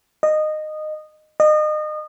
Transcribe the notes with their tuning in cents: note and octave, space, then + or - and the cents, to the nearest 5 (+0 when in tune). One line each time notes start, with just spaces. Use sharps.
D#5 -15
D#5 -30